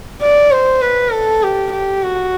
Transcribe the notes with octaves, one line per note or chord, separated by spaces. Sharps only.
D5
C5
B4
A4
G4
G4
F#4